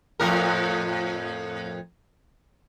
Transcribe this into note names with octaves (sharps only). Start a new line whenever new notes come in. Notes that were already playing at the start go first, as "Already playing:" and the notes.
F2 A2 A#4